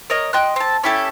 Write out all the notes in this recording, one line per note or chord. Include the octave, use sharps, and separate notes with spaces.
A#4 C#5 D#5
D#5 G5 C6 F#6
C4 A5
C#4 E4 G4 A4